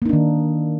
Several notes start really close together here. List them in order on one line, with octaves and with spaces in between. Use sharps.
A#3 D#4 D4 D#3